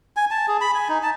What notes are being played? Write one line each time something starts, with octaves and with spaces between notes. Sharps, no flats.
G#5
A5
G#4
B5
G#5
D#4
A5